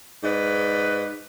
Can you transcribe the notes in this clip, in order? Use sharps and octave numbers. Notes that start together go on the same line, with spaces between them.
G#2 B4 D5 D#5